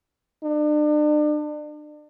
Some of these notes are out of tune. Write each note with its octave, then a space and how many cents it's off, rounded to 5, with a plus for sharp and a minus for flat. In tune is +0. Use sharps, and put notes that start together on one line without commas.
D4 +35